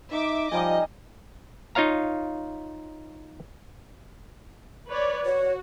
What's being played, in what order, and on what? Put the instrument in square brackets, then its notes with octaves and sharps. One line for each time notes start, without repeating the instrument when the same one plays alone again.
[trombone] D#4 [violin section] E5 D6
[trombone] F3 [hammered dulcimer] G3 D#4 G#5 [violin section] D#5
[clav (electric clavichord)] D#4 F4 C#5 F5 A#5
[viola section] B4 C#5 D5
[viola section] F#4 [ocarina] C#5